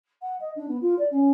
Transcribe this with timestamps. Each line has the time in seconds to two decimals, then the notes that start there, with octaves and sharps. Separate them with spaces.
0.22 F#5
0.40 D#5
0.56 D4
0.68 B3
0.82 F4
0.98 D5
1.11 C#4